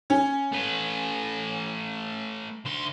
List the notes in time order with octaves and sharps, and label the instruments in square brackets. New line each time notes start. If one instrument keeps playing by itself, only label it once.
[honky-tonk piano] C#4
[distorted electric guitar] A3 B4
D2 C6